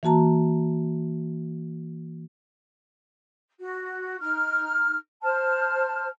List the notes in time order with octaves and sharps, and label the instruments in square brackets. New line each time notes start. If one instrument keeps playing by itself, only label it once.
[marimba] E3 A#3 F#4 A5 A#5
[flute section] F#4
D#4 F6
C5 A5 F6